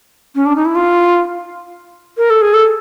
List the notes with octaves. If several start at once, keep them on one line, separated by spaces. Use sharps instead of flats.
C#4
D4
D#4
E4
F4
A#4
A4
G#4
A4